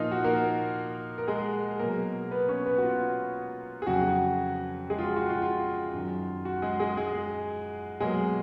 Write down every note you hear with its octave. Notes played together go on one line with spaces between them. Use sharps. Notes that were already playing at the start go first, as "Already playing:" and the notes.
Already playing: A#2 F3 A#3 D#4 F4 D#5 F5
F#4
A#3 A#4
A#4
G#3 G#4
B2 F#3 A#3 A#4
B3 B4
C#4 C#5
B3 B4
F#4
F4
G#4
F2 C#3 F#3 F#4
G#3 G#4
F4
F#4
F#4
F4
F4
F#2 D#3 F#3
F#4
G#3 G#4
G#3 G#4
G#3 G#4
B2 F#3 G#3 A#3 G#4